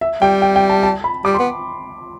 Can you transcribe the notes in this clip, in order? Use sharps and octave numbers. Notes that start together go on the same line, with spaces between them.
E5
G3 G5
G5
G5
A5
A5
B5
G3 D6
C6
B3